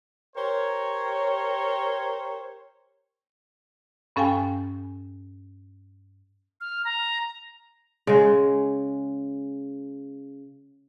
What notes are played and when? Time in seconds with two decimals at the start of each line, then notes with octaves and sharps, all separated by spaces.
0.36 G4 A#4 C5 C#5
4.16 G2 C#4 A4 F5 G5 G#5
6.61 F6
6.85 A#5
8.07 C#3 G#3